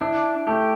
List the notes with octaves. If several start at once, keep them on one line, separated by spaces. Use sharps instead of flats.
D4 E4
A3 G4